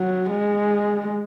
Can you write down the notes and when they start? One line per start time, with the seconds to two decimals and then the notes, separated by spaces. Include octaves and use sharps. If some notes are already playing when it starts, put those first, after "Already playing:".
Already playing: F#3
0.30 G#3